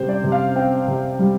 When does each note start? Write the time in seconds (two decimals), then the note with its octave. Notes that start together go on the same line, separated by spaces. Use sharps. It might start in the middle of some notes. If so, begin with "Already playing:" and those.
Already playing: C3 G3 C5
0.09 D5
0.24 C3
0.32 F5
0.56 C4 G5
0.88 C3
1.19 G3